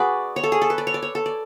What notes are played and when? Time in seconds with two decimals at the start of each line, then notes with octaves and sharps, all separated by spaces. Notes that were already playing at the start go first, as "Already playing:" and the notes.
Already playing: F#4 G#4 B4 D5
0.36 C#5
0.43 A4
0.52 G#4
0.62 A4
0.70 B4
0.78 D5
0.87 C#5
0.94 D5
1.02 C#5
1.15 A4
1.26 D5